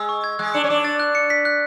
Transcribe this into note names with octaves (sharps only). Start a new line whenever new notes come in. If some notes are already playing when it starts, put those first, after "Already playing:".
Already playing: G#3 E6
C#6
G#6
G#3 F#6
D4 C#7
C#4
D4 D6
A6
F#6
C#7
B6
F#6